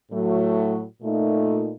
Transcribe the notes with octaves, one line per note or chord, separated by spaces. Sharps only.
A2 F#3 A3
A#2 A3 D#4